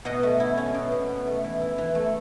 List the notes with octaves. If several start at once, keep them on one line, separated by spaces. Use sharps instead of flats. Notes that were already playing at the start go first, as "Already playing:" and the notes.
B2 D#5 F#5
A3
E4
C#4
B2
B2
B2
A3
E3
E4
E3
A3